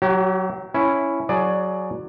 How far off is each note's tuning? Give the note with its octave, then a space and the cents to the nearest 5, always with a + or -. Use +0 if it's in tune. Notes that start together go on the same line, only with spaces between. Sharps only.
F#3 +10 G4 -35
C#4 +0 E4 +0
F#3 +0 G#4 +20 D5 +15